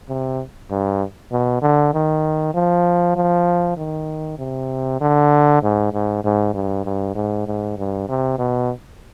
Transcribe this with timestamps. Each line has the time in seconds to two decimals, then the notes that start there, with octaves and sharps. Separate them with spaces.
0.09 C3
0.70 G2
1.32 B2
1.62 D3
1.93 D#3
2.54 F3
3.16 F3
3.77 D#3
4.38 C3
5.01 D3
5.62 G#2
5.93 G#2
6.24 G#2
6.54 G2
6.85 G2
7.15 G#2
7.47 G#2
7.77 G2
8.09 C3
8.38 B2